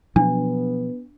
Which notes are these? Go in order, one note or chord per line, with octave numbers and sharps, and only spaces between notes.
B2 F3 F#3 B3 D4